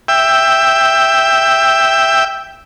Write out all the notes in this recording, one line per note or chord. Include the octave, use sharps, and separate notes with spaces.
E5 G5